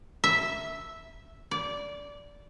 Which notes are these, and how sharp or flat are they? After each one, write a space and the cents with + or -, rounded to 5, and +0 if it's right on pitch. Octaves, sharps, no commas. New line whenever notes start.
E5 -5
D5 -15